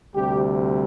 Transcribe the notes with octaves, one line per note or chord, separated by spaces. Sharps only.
D2 C3 G3 G4